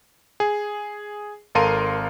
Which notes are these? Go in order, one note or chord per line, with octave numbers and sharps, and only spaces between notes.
G#4
G#1 A4 A#4 F5 C6 D#7